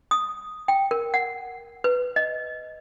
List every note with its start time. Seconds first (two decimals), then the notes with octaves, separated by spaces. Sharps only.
0.11 D#6
0.68 G5
0.91 A#4
1.14 F#5
1.84 B4
2.16 D#5